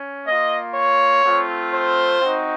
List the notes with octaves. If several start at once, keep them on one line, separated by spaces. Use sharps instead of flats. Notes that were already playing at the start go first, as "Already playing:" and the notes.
Already playing: C#4
A#3 F4 D#5
C#5
A3 C4 F4
C5
C4 D#4 F#4